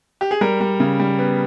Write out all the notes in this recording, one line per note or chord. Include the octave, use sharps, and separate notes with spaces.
G4
G#4
G3 A#4
G3
C#3
G3
B3